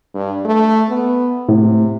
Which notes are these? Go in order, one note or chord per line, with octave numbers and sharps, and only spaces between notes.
G2
A3
B3
A2 C3